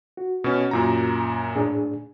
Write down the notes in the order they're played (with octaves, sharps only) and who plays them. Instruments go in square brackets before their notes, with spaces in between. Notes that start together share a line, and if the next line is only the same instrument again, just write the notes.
[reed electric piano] F#4
[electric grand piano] B2 C#4
F#2 A#2 A#5
[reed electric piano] A2 D4 G#4